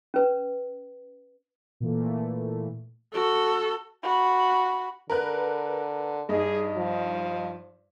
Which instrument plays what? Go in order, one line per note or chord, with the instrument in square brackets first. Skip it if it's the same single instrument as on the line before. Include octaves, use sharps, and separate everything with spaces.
[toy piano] C#4 B4
[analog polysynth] A#2 E3 A3
[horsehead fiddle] F#4 [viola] A4
[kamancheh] F#4 B5
[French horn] D3 [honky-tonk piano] A#4 B4 F#6
[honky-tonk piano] G2 D#4 [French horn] G#4
[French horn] F3